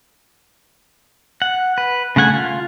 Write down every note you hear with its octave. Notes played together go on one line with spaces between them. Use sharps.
F#5
B4
C#3 A3 F#5 G#5
F4